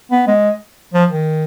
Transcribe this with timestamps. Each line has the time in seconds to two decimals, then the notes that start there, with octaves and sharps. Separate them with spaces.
0.11 B3
0.27 G#3
0.94 F3
1.10 D#3